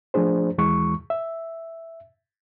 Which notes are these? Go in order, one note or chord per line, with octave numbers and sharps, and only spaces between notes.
F3 A3 D4 G#4 C5
D#2 E3 G#3 C#6
E5